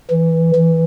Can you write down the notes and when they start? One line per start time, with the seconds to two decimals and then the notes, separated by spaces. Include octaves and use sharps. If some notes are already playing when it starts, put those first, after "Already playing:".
0.11 E3
0.55 E3